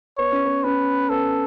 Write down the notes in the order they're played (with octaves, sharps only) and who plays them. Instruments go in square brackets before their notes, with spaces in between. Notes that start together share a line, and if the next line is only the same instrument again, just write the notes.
[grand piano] B3 [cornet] C#5
[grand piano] C#4
B3
[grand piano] C#4 [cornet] B4
[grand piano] B3 [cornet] A4